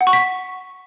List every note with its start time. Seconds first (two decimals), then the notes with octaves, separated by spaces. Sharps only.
0.01 F#5
0.07 C#6
0.13 B6